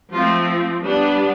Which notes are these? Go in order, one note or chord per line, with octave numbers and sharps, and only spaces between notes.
F3 A3 C4 F4
G3 B3 D4